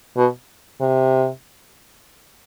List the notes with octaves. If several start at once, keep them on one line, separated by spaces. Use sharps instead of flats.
B2
C3